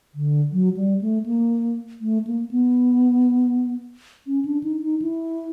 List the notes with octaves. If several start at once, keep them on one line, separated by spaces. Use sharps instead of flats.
D3
F#3
G3
A3
A#3
A3
A#3
B3
C#4
D4
D#4
D#4
E4